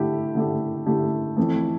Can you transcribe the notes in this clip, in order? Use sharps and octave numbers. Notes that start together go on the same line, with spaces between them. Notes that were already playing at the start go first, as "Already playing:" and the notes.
Already playing: D3 A3 E4 G4
D3 A3 E4 G4
D3 A3 E4 G4
F2 E3 A3